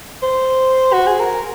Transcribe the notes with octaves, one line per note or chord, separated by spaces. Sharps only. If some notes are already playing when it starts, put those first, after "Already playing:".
C5
F#4
G#4
A#4